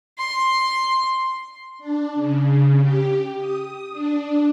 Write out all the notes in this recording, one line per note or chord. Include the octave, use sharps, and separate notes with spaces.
C6
D4
C#3
G4
D#6
D4